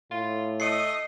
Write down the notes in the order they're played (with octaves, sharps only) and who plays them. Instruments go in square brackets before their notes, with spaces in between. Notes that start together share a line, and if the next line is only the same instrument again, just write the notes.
[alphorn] A2 [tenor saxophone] F4
[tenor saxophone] A3 [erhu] D#5 [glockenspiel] C7 C#7